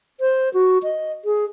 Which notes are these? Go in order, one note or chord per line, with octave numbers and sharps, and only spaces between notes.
C5
F#4
D#5
G#4